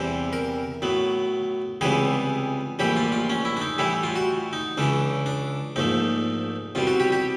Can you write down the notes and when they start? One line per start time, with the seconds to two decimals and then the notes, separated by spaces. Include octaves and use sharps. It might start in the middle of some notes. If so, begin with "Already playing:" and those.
Already playing: E2 C3 E3 G3 C5
0.33 A#4
0.82 A2 F#3 B3
1.81 C#2 C3 E3 G3 B3 G#4
2.79 A#1 A2 E3 G3 G4
2.96 F4
3.12 F4
3.30 C#4
3.45 E4
3.57 D4
3.61 D#4
3.78 A2 E3 G3 E4
4.03 F4
4.16 F#4
4.53 D#4
4.77 C#2 C#3 E3 D4
5.26 D4
5.76 A#1 G#2 F3 A3 D#4
6.75 C2 B2 G3 F4
6.87 F#4
7.00 G4
7.12 G4